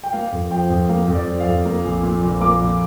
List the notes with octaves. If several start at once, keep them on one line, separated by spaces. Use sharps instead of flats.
G5
A#3 F5
F2
F3 G5
F2
A#3 F5
F2
D5
F3
F5
F2
A#3
A#1
A#2
A#1
A#3 D6
A#1